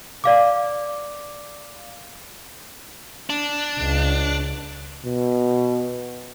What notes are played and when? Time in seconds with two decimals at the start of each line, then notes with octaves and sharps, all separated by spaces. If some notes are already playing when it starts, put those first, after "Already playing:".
0.24 D5 F5 D6
3.30 D4
3.79 C#2
5.05 B2